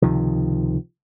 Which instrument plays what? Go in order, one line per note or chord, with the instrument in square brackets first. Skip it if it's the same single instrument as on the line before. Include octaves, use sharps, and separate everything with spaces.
[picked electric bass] C#2 C3 D#3 F3